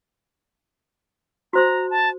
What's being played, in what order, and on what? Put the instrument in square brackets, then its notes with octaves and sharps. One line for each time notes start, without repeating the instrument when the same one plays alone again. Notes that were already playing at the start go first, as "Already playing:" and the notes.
[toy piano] F#4 C5 C6 [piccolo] A#5
[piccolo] A5